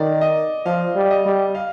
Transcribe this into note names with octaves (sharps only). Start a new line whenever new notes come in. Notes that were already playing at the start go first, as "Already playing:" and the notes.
Already playing: D#3 D5
D#5
F3 F5
G3
D#5
G3
F5